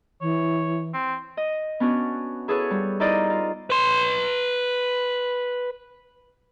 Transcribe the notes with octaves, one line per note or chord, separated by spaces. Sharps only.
E3 C#5
C4
D#5
B3 C#4 D4 F#4
E4 G#4 A4 B4 C#5 F#5
G3
D#4 E4 A#4 C5 D5 D#5
F4
B4 C6